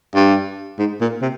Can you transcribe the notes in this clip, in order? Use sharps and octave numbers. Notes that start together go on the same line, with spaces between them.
G2
G#2
A#2
C3